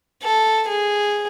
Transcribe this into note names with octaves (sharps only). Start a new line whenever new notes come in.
A4
G#4